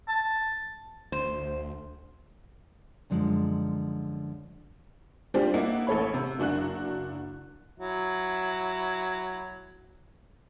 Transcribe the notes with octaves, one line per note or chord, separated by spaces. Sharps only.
A5
D2 C5
F#2 D3 F3 G#3
G3 C4 D4 F4 G4 C5
A#3 E4 D5 D#5 F#5
A1 A4 C#5 B5
C3
F#1 F#3 D4 F#4 F#6
F#3 E4